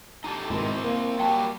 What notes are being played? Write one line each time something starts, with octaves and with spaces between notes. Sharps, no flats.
D#4 G4 A4
G#2 B2 D#3 C4 E4
A#3
F#3 G3 G5 A5